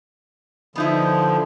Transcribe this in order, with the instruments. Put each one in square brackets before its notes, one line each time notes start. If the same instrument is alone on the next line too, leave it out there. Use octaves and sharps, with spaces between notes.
[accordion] D3 F3 [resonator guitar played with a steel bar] B3 D#4 E4